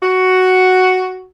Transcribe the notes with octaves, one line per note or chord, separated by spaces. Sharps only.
F#4